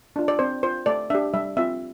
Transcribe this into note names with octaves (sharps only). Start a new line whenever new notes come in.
D4 F4
D5
C4 C5
F4 C5
A3 D5
D4 G4 E5
G3 E5
C4 F4 E5